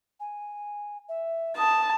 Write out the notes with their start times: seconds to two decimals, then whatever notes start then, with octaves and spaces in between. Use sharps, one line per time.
0.20 G#5
1.09 E5
1.57 A5 D#6